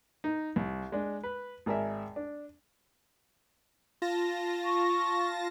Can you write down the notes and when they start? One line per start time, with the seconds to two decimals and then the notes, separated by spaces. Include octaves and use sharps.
0.24 D#4
0.56 C2
0.92 G#3 D4
1.24 B4
1.66 G#1 G#4 A#4 D5 E5
2.16 D4
4.02 F4 A5 A#6
4.65 C#6